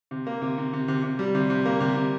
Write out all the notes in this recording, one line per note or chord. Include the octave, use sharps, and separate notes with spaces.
C3
A#3
C3
C3
C3
C3
C3
G3
C3
C3
A#3
C3
C3